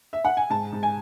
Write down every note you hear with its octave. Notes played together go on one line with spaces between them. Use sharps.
E5
F#5
G#5
G#2 A5
G#2
G#5